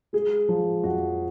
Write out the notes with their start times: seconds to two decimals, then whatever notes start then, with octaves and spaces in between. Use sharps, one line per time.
0.13 G#3 G#4
0.49 F3
0.84 F2 F#4